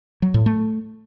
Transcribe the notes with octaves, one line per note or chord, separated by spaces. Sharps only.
F#3
A2
A3